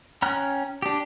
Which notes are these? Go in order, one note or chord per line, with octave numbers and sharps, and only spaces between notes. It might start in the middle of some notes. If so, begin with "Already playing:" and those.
C#4 G5 A#5 F6 F#6
D4 G4